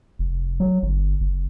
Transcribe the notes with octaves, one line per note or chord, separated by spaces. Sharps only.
F1
F#3
G1
F#1